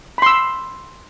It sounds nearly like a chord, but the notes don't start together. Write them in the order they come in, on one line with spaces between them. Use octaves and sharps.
B5 C6 E6